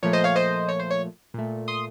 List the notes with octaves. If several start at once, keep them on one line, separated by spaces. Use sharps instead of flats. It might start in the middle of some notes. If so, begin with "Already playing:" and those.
A#2 F3 A3 C#5
C5 D#5
C#5 F5
C5 D#5
C#5
C5
C#5
A#2 A3
C6 D#6